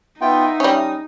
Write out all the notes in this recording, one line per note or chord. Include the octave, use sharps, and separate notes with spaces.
B3 D#4 F4 E5 G5
G3 C#4 D#6